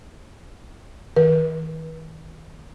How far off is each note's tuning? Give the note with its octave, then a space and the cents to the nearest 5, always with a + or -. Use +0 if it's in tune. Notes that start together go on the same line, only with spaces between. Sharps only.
D#3 +40 B4 -35